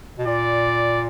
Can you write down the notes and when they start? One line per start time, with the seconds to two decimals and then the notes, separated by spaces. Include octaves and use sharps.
0.18 B2
0.27 A#2 D5